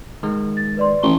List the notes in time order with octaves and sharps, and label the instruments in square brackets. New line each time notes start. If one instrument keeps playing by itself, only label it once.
[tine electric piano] D#3 G#3
[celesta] A6
B4 D5 C6
[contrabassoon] A1 [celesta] C6 C#6 G7